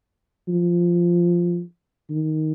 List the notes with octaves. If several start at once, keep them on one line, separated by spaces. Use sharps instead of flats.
F3
D#3